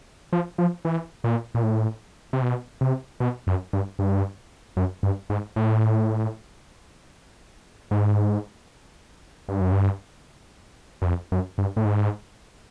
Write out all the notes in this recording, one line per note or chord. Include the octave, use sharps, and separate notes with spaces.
F3
F3
E3
A#2
A#2
A2
C3
B2
C3
B2
F#2
G2
G2
F#2
G2
G#2
A2
G#2
G2
F#2
G2
F#2
F2
F#2
G2
A2
G#2